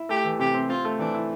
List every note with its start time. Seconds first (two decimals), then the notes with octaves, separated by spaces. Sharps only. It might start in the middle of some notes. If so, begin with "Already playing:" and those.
Already playing: E4
0.09 A3 G4
0.25 E3
0.39 C3 G4
0.54 C4
0.69 C4 F4
0.85 A3
0.99 E3 D4
1.15 E4